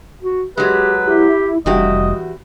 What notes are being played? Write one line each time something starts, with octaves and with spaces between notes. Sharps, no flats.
F#4
F#3 G#3 G4 B4
E4 G4
F1 E2 G3 F#4 G4 D#5